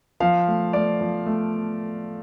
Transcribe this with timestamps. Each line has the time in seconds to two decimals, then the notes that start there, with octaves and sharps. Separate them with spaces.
0.20 F3 F5
0.48 A3
0.73 A3 D5
1.01 F3
1.26 A3